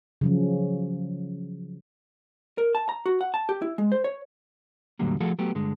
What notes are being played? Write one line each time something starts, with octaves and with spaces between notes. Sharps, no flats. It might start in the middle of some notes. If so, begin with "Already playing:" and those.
C#3 F3 F#3
A#4
A5
A#5
F#4
F#5
A5
G4
E4
G#3
C5
C#5
E2 A2 D3 F#3 G3 A#3
F3 A3 F#4 G#4 A4
F#3 A3 B3 G4
G2 D3 G#3